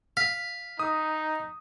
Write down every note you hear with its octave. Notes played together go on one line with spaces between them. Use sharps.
F5 B6
D#4 D#6